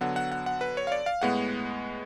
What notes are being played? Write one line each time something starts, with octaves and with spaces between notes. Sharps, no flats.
D3 F#3 B3 F#5
F#5
F#5
F#5
B4
C#5
F5
D5
F5
A2 G#3 B3 F#5